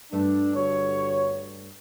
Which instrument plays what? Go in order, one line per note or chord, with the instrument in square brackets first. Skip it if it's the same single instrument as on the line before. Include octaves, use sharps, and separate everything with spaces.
[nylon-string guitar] G2 A3 [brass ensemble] D4
[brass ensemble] G1 F#4 C#5